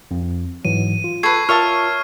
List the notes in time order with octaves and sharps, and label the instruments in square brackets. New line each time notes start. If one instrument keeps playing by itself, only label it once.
[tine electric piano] F2
[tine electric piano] G#2 E3 F#3 [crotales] D#7
[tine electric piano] F4
[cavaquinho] A4 B4 [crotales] C#6 G#6 C7
[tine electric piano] F4 A#4 [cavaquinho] C#5 E5 A5 [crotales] F6